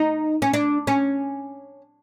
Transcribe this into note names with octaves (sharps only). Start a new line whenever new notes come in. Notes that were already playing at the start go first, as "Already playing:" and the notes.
Already playing: D#4
C#4
D4
C#4